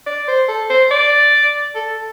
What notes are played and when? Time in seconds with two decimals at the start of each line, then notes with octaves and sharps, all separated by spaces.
0.07 D5
0.28 C5
0.49 A4
0.70 C5
0.91 D5
1.75 A4